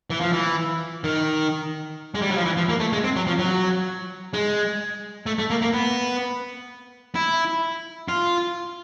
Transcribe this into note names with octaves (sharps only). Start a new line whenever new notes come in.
E3
F3
E3
D#3
G#3
G3
F#3
F3
E3
F3
A#3
A3
G#3
C4
F#3
F3
F#3
G#3
A3
A3
A#3
A#3
B3
E4
F4